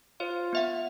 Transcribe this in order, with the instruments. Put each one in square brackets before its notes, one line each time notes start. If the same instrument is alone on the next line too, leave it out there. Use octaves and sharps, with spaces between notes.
[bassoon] F4 [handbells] C5 C#5
[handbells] B3 E5 F#5